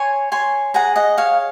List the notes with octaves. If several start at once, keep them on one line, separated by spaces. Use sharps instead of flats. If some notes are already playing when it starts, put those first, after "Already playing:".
Already playing: C#5 G#5 C6
C#5 G#5 C6
G#4 F#5 A#5
D#5 F#5
C#5 F5